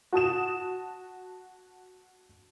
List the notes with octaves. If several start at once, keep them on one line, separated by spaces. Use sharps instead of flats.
F#4 A5 D#6 E7